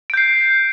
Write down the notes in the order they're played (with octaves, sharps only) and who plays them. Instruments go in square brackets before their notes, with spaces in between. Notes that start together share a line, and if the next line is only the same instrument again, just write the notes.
[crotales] D7
G6
C7